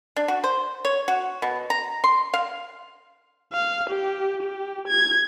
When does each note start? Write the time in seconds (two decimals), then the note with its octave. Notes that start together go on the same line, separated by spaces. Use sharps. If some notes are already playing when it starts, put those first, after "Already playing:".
0.16 D4
0.28 F#4
0.44 C5
0.85 C#5
1.08 F#4
1.42 B2
1.70 A#5
2.04 C6
2.34 F5
3.53 F5
3.90 G4
4.43 G4
4.88 G#6